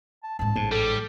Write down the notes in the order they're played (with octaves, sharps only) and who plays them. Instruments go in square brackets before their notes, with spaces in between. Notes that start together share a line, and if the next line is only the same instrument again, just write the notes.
[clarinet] A5
[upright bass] A1 G#2 [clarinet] A5
[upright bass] A1 [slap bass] G#2
[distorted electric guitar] G3 [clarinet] A4